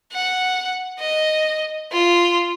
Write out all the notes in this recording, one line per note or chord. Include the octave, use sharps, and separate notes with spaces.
F#5
D#5
F4